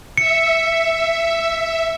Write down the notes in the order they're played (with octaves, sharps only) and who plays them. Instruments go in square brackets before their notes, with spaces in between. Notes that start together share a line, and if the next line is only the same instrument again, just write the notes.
[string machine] E5 [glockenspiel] C#7